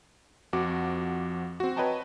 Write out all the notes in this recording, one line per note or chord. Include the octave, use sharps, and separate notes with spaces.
F2 F3 F#4 D6
C4 F#4
B4 C#5 D#5 G5 A5 A#5